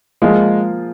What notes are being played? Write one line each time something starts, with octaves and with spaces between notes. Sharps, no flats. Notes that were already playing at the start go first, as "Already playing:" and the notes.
F3 G#3 A#3 F4 G#4